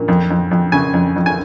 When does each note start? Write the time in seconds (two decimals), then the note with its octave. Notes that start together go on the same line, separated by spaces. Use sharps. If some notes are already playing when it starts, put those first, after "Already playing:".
Already playing: A#2
0.08 F2
0.30 F2
0.51 F2
0.72 C#3 G#5
0.94 F2
1.16 F2
1.26 G#5